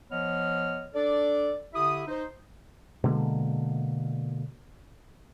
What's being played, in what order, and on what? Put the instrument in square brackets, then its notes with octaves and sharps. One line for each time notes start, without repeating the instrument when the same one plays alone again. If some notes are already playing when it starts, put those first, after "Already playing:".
[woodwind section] F3 B3 C#5 D#5 F6
D4 A4 D5
D3 E4 G4 E5 D#6
D#4 C5
[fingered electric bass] B2 D3 G#3 A#3